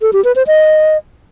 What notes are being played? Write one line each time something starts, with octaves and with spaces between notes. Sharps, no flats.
A4
G4
B4
C5
D#5